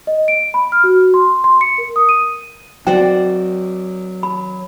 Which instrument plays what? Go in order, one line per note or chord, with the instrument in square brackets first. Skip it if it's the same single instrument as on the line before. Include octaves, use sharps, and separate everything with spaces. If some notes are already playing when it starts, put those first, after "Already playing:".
[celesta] D#5
D7
B5
F6
F#4
C6
C6
C#7
A#4
D#6
D#7
[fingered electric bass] F#3 C4 [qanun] F#4 C5 D5 [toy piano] G5
[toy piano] B5